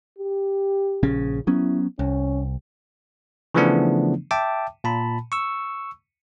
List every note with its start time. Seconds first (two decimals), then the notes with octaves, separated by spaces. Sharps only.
0.18 G4
1.03 A#1 C#3 C#4
1.47 F#3 B3 C#4 E4
1.99 C2 C#4
3.54 C#3 E3 F3 A3 B3 D4
4.31 E5 G5 A5 D6
4.84 A#2 A5 B5
5.32 C#6 E6